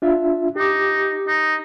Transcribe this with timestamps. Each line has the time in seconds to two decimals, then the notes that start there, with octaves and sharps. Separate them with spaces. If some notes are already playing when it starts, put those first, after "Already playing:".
0.02 D4 F4 E5
0.56 D#4 G4 D6
1.27 D#4